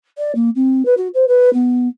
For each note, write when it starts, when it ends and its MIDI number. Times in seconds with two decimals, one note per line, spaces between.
0.18 0.32 74
0.35 0.50 58
0.55 0.85 60
0.85 0.94 71
0.97 1.08 66
1.14 1.25 72
1.28 1.53 71
1.53 1.88 59